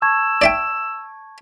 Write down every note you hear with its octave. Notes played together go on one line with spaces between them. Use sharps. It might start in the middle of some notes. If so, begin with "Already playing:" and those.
A5 C#6 E6 G#6
D5 E5 G5